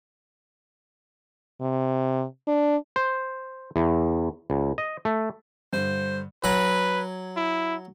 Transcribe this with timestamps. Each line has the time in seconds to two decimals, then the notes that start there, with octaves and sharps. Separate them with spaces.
1.61 C3
2.48 D4
2.96 C5
3.76 E2
4.50 C#2
4.78 D#5
5.05 A3
5.73 G2 D3 C5
6.44 F#3 B4 G#5
7.37 E4